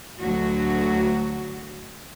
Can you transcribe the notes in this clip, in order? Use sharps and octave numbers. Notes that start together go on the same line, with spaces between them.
D2 F#3 F#4